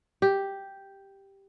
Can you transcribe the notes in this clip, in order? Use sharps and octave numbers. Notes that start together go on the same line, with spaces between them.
G4